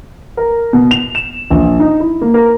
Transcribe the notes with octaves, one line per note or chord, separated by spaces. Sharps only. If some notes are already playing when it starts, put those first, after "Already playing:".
A#4
B2
F7
E7
A#1
D#4
E4
A#3
A#4